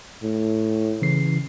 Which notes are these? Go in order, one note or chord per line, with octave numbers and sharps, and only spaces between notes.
A2
C#3 E3 C7